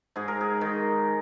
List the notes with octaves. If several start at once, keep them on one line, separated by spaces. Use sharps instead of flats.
G#2 G#4
A#4
G#4
D#3